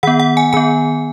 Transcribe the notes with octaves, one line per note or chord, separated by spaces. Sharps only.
D#3 B3 F#5
F#5
G#5
D#3 B3 G#5